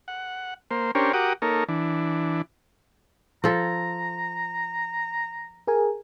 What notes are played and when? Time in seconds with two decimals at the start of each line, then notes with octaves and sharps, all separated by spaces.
0.08 F#5
0.71 A#3 C5
0.95 C#4 D4 G4 A#4 C5 C#5
1.13 F#4 G4 A#4 F#5 D6 D#6
1.42 A#3 D#4 A4 A#4 C#5
1.68 E3 D4
3.44 F3 A4 A#5
5.67 G#4 A#4 G#5